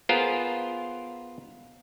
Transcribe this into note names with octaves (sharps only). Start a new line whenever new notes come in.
B3 F4 G#4 A#4 C5